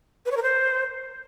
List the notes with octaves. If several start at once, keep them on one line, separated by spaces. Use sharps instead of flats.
B4
C#5
A#4
C5